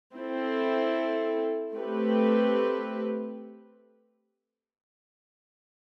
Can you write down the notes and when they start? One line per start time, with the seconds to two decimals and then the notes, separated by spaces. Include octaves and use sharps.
0.15 C4 E4 A4
1.74 A3 C4 G4 B4